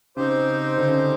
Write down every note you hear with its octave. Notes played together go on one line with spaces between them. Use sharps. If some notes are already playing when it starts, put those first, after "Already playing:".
C#3 C4 D#4 G4 C5
D3
C#3